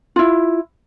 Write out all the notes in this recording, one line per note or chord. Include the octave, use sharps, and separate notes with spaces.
E4 F4